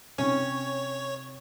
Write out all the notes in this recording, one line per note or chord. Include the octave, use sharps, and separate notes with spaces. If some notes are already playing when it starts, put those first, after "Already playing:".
C3 C#4 D#4 C#5